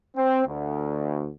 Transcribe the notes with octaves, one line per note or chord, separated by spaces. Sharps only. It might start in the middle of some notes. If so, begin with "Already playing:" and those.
C4
D2